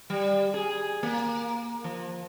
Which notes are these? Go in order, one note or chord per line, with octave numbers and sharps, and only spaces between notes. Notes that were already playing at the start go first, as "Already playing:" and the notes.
G3
G#4
A#3
F3